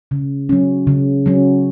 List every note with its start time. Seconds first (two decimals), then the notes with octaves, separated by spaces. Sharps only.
0.11 C#3
0.49 F#3 C#4
0.87 C#3
1.26 F#3 C#4